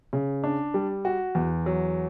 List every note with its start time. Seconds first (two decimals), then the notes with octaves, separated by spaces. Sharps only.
0.13 C#3
0.44 D4
0.74 G3
1.05 F#4
1.35 E2
1.66 F#3